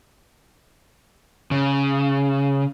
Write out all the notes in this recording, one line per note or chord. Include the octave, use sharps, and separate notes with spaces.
C#3